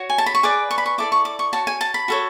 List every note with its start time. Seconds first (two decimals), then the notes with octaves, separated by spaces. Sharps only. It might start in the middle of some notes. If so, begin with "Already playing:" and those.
Already playing: F#4 C#5
0.10 G#5
0.18 A5
0.26 B5
0.35 C#6
0.43 G#4 B4 D5 D6
0.71 C#6
0.78 B5
0.86 C#6
0.98 E4 A4 D5 D6
1.12 C#6
1.25 D6
1.39 C#6
1.53 F#4 C#5 A5
1.67 G#5
1.81 A5
1.94 B5
2.08 F#4 A4 C#5